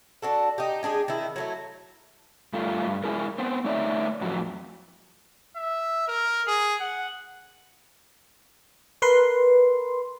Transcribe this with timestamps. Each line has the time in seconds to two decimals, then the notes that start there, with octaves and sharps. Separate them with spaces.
0.22 D4 F#4 A4
0.58 D#4 G4
0.83 G#3 D4 G4 G#4
1.08 D#3 E4
1.36 F#3 A3 E4
2.53 G2 A3 F4
2.86 G2
3.04 G#3 E4 G#4 A#4
3.38 B3 C4
3.64 A3 D#4 C#5 D5 E5
4.21 F2 A2 F#3
5.56 E5
6.08 A#4
6.47 G#4
6.80 F#5
9.02 A#4 B4 C6